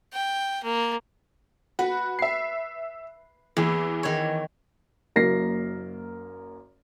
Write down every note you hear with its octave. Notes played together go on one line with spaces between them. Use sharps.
G5
A#3
F#4 B4
E5 C7
E2 E3
D#3 C#5
F#1 F#2 A#3 A#4 A#6 C7